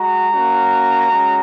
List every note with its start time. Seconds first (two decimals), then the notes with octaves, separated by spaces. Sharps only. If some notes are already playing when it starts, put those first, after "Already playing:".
Already playing: G#3 F#4 A#5
0.32 A#3 C#4 F#4
1.07 G#3 C#4 F#4